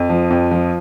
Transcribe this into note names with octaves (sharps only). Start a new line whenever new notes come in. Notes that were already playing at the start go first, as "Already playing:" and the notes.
Already playing: F2
F3
F2
F3